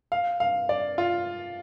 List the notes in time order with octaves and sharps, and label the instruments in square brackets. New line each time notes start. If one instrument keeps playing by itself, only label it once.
[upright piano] F5
F5
D5
F4